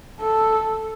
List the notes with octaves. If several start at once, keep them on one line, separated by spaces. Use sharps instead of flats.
A4